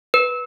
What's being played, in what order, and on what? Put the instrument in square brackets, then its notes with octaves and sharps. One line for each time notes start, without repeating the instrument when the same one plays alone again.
[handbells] B4